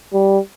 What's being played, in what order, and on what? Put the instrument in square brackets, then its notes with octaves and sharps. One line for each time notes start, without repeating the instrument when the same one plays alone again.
[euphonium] G3